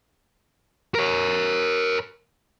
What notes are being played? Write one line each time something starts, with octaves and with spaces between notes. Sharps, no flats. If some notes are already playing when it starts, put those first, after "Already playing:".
A#4 C#5